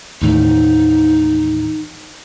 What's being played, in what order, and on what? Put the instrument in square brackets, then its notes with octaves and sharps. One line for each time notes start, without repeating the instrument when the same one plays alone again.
[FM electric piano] D#2 A2 E3 [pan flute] D#4